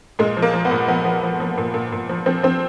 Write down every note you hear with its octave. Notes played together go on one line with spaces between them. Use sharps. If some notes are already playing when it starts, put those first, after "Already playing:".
A#2 G#3
F3
A#3
F3
B3
A#2
F3 B3
F3
F3
F3
A#2
A#2
A#2
F3
F3 C4
F3 C4